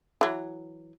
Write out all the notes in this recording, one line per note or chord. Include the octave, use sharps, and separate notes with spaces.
E3 F#3